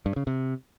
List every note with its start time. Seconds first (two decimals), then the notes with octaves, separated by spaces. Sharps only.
0.06 G2
0.16 C#3
0.27 C3